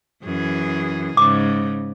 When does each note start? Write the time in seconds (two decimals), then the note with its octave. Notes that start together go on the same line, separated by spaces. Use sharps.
0.23 F#2 E3 G#4
1.17 G#2 C#3 D6